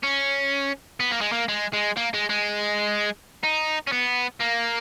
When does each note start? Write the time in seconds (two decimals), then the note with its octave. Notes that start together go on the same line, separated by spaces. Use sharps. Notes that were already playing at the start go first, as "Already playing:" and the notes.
0.03 C#4
1.00 B3
1.11 A#3
1.21 G#3
1.32 A#3
1.48 G#3
1.73 G#3
1.97 A#3
2.14 G#3
2.29 G#3
3.43 D#4
3.87 C#4
3.92 B3
4.41 A#3